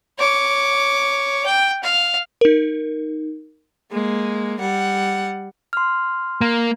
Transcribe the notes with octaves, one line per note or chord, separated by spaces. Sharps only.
C#5 D6
G5
F5
D#4 A#4
G#3 A#3
G3 F#5
C6 F6
A#3